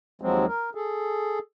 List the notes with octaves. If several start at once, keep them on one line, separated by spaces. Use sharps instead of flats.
D#2 F3 F#3 G#3 C4
A#4
G#4 A4